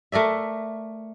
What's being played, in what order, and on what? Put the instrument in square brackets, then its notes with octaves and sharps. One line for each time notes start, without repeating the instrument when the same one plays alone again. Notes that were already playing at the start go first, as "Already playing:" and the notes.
[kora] A3 A#4 D5 E5